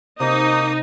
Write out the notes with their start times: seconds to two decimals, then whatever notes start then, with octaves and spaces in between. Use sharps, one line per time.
0.20 C3 A#3 D#4 D#6